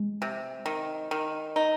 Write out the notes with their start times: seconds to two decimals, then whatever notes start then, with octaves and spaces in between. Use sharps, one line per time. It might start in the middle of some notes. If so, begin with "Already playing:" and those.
Already playing: G#3
0.22 C3
0.66 D#3
1.11 D#3
1.56 D#4